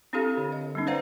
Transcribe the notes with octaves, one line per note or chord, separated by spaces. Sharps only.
C4 D4 E4 G4 A4 F5
D3 C#5
D#5
G3 B3 C#4 D#4
B4 C5 D5 F5 F#5 A#5